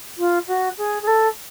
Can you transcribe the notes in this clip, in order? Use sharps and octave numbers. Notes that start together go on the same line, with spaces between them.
F4
F#4
G#4
G#4
A4